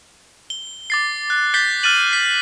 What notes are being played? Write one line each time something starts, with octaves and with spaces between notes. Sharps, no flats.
G7
D6 A6 C7
F#6
G6 A6 B6 C7 G7
F6 F#6 A6 D#7 F#7
B6